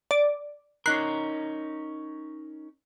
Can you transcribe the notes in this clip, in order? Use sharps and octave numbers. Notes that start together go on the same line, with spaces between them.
D5
C#4 D#4 A#4 F#6 C7